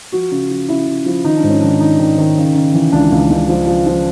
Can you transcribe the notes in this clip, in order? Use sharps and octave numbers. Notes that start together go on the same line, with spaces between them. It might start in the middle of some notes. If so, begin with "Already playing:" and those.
F3 F#4
C#3
F3
C#3 E4
C#3
F3
D#3 D#4
D4
G#2
C#4
D#3 D4
D#3 D#4
D#3
D#3
C#3
C#3
E3
C#2 D4
C#2
C#2
F3
F3
F3